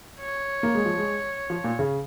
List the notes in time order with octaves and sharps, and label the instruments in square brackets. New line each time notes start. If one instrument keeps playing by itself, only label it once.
[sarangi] C#5
[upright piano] A#3
G#3
F3
G#3
F3
A#2
C#3